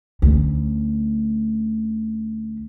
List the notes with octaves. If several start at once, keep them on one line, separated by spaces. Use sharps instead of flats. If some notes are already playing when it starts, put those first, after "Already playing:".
D2 C#4